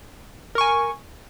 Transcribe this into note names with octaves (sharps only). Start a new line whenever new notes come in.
A#4 G#5 C#6